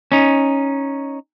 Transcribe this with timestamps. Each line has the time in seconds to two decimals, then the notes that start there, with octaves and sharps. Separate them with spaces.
0.12 C#4 D#4